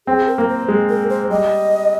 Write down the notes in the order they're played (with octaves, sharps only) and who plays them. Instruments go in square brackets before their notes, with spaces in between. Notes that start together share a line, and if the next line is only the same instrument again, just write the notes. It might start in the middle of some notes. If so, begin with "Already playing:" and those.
[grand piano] C4 [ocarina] G#4
[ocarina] A#4
[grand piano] A#3
[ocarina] C5
[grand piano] G#3
[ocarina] A#4
C5
[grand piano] G3 [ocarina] D#5